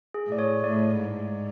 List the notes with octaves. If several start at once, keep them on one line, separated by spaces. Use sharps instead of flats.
G#4
A2 D5
C#5
A2 D5
G#2